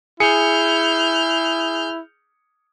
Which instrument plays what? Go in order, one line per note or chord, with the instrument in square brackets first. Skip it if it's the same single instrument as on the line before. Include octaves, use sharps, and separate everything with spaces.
[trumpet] E4 [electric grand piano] G#4 C#7 [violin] F6 G6